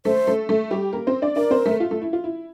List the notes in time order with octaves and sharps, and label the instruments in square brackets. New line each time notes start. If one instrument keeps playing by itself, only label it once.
[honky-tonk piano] A3 A4 [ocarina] C5
[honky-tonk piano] A3 A4
A3 A4
G3 G4
A#3 A#4
C4 C5
D4 D5
[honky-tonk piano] D4 D5 [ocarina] A#4
[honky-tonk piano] C4 C5
A3 A4
F4
A3 A4
E4
F4
E4